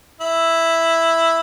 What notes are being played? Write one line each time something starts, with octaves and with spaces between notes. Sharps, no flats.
E4